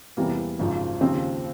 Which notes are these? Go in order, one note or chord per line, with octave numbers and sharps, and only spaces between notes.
E2 C3 E3 G3 A#3
G#1 F#2 C#3 F3
D#2 C#3 F3 C4